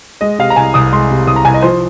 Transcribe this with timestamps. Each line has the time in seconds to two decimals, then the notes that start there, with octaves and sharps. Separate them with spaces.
0.21 G#3 D#5
0.39 C3 F5
0.50 A#5
0.56 C2 G#5
0.74 C2 D#6
0.92 G#3 C6
1.11 C3
1.27 C2 D#6
1.36 A#5
1.45 C2 G#5
1.54 D#5
1.62 F3 C5